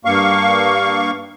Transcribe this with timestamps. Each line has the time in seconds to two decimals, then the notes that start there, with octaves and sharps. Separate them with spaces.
0.05 G2 A#3 F5 C#6